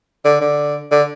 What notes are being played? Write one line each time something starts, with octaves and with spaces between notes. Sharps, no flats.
D3
D3
D3